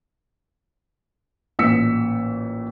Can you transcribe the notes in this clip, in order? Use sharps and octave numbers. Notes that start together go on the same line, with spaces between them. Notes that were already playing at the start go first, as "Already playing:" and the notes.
A1 A#2 E6 B6 C#7